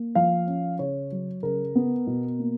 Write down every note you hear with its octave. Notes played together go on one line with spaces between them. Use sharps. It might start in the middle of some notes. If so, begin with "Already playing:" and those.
Already playing: A#3
F3 F5
C#4
C#3 C#5
F#3
C#3 A#4
B3
B2
A#3